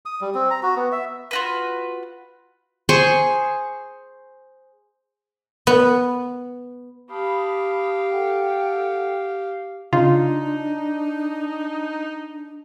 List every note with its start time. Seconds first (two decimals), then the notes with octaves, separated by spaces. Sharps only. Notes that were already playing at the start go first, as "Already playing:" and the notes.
0.06 D#6
0.21 G3
0.35 C4
0.51 A#5
0.63 F#4
0.76 B3
0.92 E5
1.31 F4 F#4 B4
2.89 G#4 C5 G#5 C#6
5.67 B3
7.10 G4 F5 A5 B5 D#6
8.11 A4 F#5 G5
9.93 C#3 D4 D#4 F4